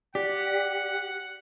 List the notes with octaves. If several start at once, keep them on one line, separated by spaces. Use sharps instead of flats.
G4 D5 F#5